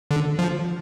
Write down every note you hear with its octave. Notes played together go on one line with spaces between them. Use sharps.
D3
F3